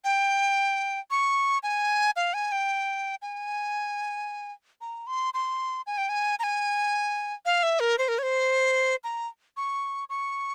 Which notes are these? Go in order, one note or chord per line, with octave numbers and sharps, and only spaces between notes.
G5
C#6
G#5
F5
G#5
G5
G#5
A#5
C6
C6
G#5
G5
G#5
A#5
G#5
F5
E5
A#4
C5
A#4
C#5
C5
A#5
C#6
C#6